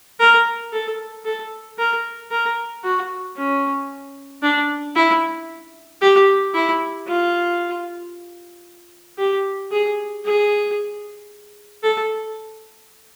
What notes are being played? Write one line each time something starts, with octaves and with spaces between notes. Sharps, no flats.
A#4
A4
A4
A#4
A#4
F#4
C#4
D4
E4
G4
E4
F4
G4
G#4
G#4
A4